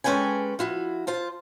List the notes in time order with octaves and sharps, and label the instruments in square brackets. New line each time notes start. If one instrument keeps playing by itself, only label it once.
[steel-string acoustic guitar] G#3 C#4 A4 B4 G5 G#5
F3 E4 F#4
F4 C5 A5